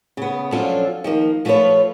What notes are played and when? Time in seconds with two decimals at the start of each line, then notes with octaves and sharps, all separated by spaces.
0.17 C#3 B3
0.52 F3 F#3 C#4 D4 F4 A4
1.04 D#3 F3 A#3
1.45 F3 A3 F4 G#4 B4 C#5